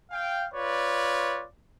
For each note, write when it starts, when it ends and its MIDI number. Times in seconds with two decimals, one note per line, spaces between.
0.11 0.47 77
0.11 0.47 79
0.54 1.46 65
0.54 1.46 71
0.54 1.46 73
0.54 1.46 74